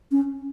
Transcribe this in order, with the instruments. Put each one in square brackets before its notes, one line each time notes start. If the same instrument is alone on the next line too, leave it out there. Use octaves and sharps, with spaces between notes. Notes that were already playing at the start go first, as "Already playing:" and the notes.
[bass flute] C#4